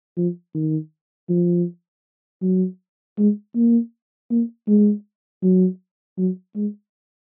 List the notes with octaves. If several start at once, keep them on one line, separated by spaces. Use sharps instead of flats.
F3
D#3
F3
F#3
G#3
A#3
A#3
G#3
F#3
F#3
G#3